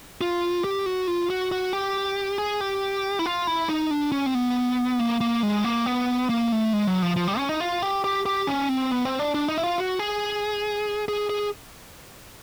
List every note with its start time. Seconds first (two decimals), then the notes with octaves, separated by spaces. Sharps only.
0.21 F4
0.64 G4
0.86 F#4
1.07 F4
1.30 F#4
1.52 F#4
1.73 G4
2.38 G#4
2.61 G4
3.19 E4
3.26 F4
3.47 E4
3.69 D#4
3.91 D4
4.12 C#4
4.26 C4
4.35 B3
4.99 A#3
5.21 A#3
5.43 G#3
5.65 A#3
5.86 B3
6.29 A#3
6.52 A3
6.73 G#3
6.87 F#3
7.02 F3
7.16 F3
7.28 G3
7.38 C#4
7.49 D#4
7.60 F4
7.82 G4
8.04 G4
8.26 G4
8.47 C#4
8.69 C4
8.91 B3
9.05 C4
9.19 D4
9.34 D4
9.48 D#4
9.58 E4
9.63 F4
9.78 F#4
9.99 G#4
11.08 G#4
11.30 G#4